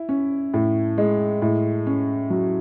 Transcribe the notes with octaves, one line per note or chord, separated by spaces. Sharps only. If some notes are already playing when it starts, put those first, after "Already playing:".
Already playing: E4
C#4
A2
G#3
A2
C#4
F#3